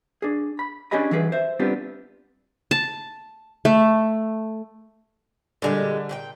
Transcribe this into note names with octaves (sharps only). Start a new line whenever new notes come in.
D4 G#4
B5
C#4 D4 G4 G#4 D#5 B5
E3 F#3 G3 G#4 A#4 B4
C5 E5
G3 B3 C4 D4 F4 G4
A5
A3
A#2 D3 G3 G#3 G4
A#2 G4 G5